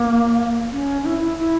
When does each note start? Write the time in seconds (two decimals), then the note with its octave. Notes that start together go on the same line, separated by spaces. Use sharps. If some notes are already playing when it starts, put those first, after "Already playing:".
Already playing: A#3
0.72 C#4
1.05 E4
1.38 E4